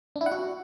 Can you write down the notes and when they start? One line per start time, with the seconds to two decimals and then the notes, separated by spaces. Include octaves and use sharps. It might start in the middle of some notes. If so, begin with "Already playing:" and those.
0.16 D4
0.21 E4
0.26 F#5
0.32 F#4